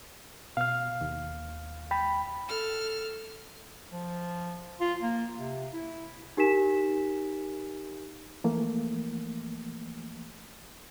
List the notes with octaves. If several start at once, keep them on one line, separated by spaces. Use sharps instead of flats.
B2 F5 F6
D#2
G5 B5
A4 F6
F3
F4
A#3
C3
E4
D#4 G4 A#4 G#5 B6 E7
E3 F3 A3 A#3